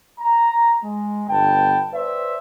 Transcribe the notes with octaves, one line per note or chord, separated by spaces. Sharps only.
A#5
G#3
G1 B3 G5 A5
B4 C5 D5 E5